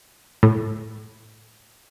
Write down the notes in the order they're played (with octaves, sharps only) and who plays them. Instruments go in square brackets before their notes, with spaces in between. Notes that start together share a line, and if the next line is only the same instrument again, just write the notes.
[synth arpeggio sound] A2